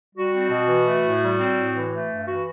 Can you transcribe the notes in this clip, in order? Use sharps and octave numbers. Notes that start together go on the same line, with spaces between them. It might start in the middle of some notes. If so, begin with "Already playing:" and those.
G3 F#4
C4
B2
E3
A3
A2
G3
C4
A2
E3
A3
G2
E3 F#4